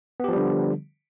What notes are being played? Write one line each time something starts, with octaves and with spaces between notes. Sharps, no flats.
D3 F3 G3 B3 G4